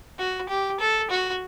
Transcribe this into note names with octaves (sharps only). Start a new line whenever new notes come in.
F#4
G4
A4
F#4